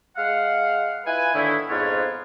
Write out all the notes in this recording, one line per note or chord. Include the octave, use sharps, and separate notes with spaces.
G#3 F5 F#5
E4 F4 B4 G#5
A2 D3 D#3 A3 E4
F2 G#2 B3 F4 C#5 A5